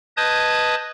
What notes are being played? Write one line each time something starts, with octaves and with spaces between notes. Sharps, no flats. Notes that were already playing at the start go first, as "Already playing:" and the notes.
B4 D#5 A5 D#6 G6 G#6